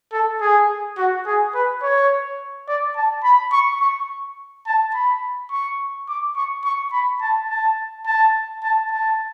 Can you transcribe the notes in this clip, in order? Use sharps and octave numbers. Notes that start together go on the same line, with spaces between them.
A4
G#4
F#4
G#4
B4
C#5
D5
A5
B5
C#6
C#6
A5
B5
C#6
D6
C#6
C#6
B5
A5
A5
A5
A5
A5